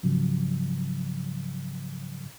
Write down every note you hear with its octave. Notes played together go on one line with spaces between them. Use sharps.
G#2 C#3 F3 F#3